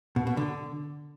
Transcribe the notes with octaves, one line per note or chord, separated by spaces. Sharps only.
B2
B2
D3